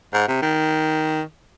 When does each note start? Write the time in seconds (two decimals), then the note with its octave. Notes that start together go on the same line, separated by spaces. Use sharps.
0.14 G#2
0.28 C3
0.42 D#3